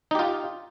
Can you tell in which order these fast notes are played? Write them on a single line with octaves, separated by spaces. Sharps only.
D#4 G4 F4